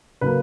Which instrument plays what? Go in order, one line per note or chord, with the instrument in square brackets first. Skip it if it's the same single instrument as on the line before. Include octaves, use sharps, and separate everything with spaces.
[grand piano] C#3 F#3 A#3 B4